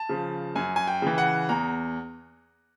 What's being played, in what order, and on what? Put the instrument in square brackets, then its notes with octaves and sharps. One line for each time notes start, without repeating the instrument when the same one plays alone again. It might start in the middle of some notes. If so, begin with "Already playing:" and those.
Already playing: [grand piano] A5
C#3 F3
F#2 G#5
G#5
G5
C#3 E3
F#5
E2 A#5